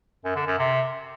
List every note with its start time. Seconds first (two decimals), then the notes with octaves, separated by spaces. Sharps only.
0.25 F#2
0.36 D3
0.47 F#2
0.58 C3